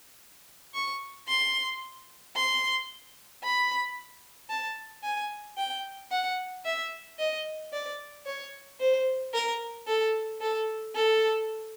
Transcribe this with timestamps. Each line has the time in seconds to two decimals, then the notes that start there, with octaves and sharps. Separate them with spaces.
0.74 C#6
1.28 C6
2.35 C6
3.43 B5
4.50 A5
5.03 G#5
5.57 G5
6.11 F#5
6.65 E5
7.19 D#5
7.73 D5
8.26 C#5
8.80 C5
9.33 A#4
9.87 A4
10.41 A4
10.94 A4